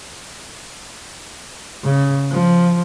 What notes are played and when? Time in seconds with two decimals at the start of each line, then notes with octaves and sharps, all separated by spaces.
1.84 C#3
2.31 F3